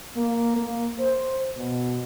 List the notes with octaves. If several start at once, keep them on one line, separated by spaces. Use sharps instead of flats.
A#3
A#3
C5
B2